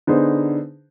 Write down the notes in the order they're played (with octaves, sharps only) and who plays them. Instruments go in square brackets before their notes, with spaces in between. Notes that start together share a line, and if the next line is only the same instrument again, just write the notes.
[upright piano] D3 B3 D#4 G#4 C5